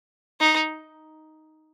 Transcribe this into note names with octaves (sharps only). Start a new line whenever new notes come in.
D#4